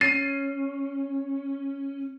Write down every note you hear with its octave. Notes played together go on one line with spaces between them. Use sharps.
C#4 A6 C7 D#7